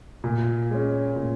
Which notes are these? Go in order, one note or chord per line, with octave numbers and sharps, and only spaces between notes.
A#2
G#3 C#4
A#2